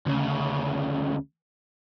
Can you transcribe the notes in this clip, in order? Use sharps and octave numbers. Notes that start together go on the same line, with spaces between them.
D2 C#3